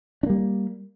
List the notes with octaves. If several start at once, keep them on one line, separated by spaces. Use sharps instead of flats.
G3 A#3 D4